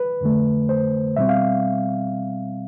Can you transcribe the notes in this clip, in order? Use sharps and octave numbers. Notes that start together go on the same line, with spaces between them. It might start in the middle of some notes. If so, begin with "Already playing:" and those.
Already playing: B4
F2 D3 A3
C5
B2 G3 C4 E5
F5